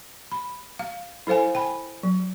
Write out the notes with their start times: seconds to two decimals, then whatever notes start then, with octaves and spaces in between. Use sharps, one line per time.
0.32 B5
0.79 F5
1.27 E4 A4 C5 F5 G#5
1.55 G5 G#5 B5
2.03 F#3